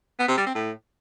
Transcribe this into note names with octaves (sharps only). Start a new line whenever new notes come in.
B3
C3
G3
C4
A2